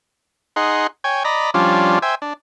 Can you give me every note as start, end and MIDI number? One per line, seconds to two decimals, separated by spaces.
0.56 0.87 63
0.56 0.87 68
0.56 0.87 78
0.56 0.87 84
1.04 1.23 73
1.04 1.23 79
1.04 1.23 80
1.25 1.50 74
1.25 1.50 75
1.25 1.50 82
1.25 1.50 83
1.54 1.99 53
1.54 1.99 55
1.54 1.99 61
1.54 1.99 62
1.54 1.99 65
2.02 2.15 72
2.02 2.15 76
2.02 2.15 79
2.02 2.15 80
2.22 2.33 62